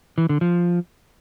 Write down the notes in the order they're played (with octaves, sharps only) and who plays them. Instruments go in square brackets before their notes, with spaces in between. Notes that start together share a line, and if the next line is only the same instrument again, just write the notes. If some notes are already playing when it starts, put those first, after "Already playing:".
[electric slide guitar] E3
D3
F3